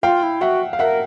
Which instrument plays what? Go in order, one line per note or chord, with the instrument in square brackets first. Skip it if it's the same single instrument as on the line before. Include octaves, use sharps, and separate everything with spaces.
[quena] F4 [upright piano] F5 G5
[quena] E4
[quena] F#4 [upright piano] E5 F#5
[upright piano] F5
[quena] A#4 [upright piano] E5 F#5